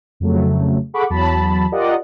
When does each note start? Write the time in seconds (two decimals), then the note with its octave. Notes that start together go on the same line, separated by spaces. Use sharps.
0.20 F2 C#3 F#3 A3
0.94 G#4 A4 F#5 B5 C#6 D6
1.10 E2 F#3 A5 B5
1.72 F4 G4 A#4 D5 D#5 F#5